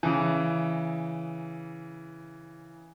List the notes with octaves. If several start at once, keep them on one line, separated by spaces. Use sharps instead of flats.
C#3 E3